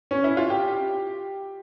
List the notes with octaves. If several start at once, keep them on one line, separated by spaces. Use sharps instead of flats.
C#4
E4
F4
G4